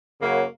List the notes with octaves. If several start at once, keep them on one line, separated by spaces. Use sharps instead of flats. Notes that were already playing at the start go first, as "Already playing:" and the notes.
F#2 C#3 A#3 F#4 C#5